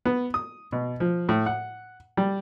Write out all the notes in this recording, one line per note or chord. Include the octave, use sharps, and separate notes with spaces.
B3
D#6
B2
F3
A2
F#5
G3